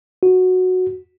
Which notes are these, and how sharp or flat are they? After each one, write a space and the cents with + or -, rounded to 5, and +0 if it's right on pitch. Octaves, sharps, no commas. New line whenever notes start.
F#4 -5